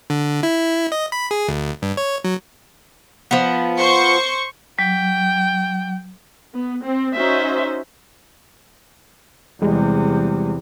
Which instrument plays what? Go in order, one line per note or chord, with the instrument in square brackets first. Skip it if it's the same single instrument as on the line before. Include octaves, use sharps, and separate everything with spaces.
[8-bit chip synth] D3
E4
D#5
B5
G#4
D2
G2
C#5
F#3
[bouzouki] F3 B3
[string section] C5 C#6 G6
[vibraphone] F#3 [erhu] G5
[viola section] B3
C4
C#4 D#4 F#4 C5 E5
[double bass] E2 C3 [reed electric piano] G3 G#3